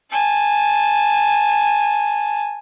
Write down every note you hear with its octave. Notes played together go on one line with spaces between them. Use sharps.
G#5 A5